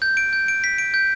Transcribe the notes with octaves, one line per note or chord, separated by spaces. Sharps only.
G6
D7
G6
D7
B6
D7
G6